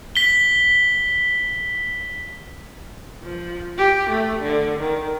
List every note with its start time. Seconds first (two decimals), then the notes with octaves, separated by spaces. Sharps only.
0.15 B6 G7
3.23 F3
3.78 G4
4.10 A3
4.42 D3
4.79 D#3